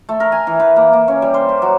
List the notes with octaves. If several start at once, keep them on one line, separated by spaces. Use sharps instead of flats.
A3
A#4
G#5
E3
B4
A#3
A#3
C#4
G3
C5
G4
F#3